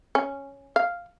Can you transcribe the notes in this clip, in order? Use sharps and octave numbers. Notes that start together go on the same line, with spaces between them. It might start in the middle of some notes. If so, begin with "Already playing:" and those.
C#4
F5